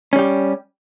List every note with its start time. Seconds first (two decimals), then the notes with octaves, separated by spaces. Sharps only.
0.13 C#4
0.16 G3
0.19 G4